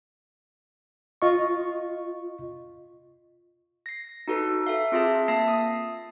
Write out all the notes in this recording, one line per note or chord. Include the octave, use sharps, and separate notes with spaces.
F4 D#5 C#6
A#6 C7
D#4 F#4 A4 B4
A4 E5 F5
C4 F4 G#4 E5 A5
A#3 E5 A5 A#6 C7
D#6